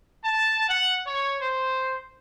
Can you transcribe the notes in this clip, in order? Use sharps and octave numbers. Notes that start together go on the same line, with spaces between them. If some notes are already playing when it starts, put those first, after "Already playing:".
A5
F#5
C#5
C5